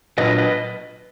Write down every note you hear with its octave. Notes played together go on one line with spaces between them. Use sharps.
A#2 F#3 D4 F4 B4 D#5
B4 D#5